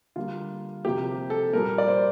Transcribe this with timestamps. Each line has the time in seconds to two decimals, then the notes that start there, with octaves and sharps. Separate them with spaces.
0.16 D3 G3 A#3 F4
0.85 C3 F3 A#3 G4
1.30 A4
1.53 A#2 G3 A#3 A#4
1.78 D5
1.88 C5